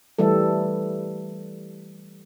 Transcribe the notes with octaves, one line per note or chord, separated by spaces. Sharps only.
E3 G3 A3 A4